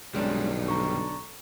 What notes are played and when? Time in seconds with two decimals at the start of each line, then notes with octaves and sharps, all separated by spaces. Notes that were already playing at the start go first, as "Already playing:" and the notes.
0.14 B1 G2 D#3 G3 G#3 C#4 D4
0.68 D3 A#5 C#6